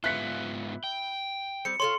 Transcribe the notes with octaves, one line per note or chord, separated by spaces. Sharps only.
G#2 B3 E4 F4 F#6 B6 C#7
G5
G3 C4 C#7
F4 A4 C#5 C6